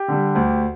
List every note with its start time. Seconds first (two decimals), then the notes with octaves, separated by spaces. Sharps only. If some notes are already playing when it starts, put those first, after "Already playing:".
Already playing: G4
0.08 D3 G3
0.35 D2